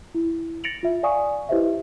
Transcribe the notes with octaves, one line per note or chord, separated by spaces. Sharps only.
E4
A6 A#6 C#7 D7 F7 F#7
F4 E5
D5 F5 G#5 C#6 D#6
E4 G4 B4 C5 D#5 E5